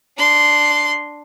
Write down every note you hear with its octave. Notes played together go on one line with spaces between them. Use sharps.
D4 C6